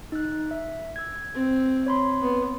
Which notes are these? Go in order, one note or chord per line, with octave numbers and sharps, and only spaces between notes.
D#4 F#6
E5
E6 G#6
C4
C#5 B5 C6
B3